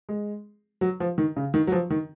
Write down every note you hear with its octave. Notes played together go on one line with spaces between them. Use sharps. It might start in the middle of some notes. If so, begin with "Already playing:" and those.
G#3
F#3
F3
D#3
C#3
D#3
F#3
F3
D#3